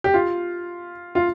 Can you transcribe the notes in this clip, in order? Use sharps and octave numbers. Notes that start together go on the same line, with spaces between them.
G4
F4
F4